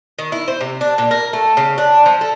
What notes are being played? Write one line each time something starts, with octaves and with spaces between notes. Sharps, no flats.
D#3
E4
C5
C3
D4
A#2
A#4
A3
C#3
D4
F3
A4